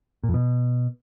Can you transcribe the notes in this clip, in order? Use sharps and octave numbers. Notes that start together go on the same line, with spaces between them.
A#2
F2
B2